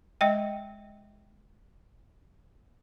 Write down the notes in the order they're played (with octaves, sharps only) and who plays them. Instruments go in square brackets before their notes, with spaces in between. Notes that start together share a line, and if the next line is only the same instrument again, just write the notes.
[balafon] G#3 D#5 G5